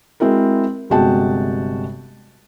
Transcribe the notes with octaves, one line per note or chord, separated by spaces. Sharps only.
G#3 C4 E4 F#4 A#4
G1 C3 G#3 F#4 G5 A5